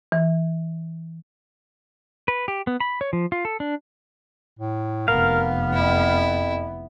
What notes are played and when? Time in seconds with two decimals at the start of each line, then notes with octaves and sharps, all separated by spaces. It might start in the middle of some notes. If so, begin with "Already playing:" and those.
0.12 E3
2.28 B4
2.48 G4
2.67 B3
2.80 B5
3.01 C#5
3.13 F3
3.32 F4
3.45 A4
3.60 D4
4.59 A2
5.08 F1 B3 A#4 F5
5.74 F2 E4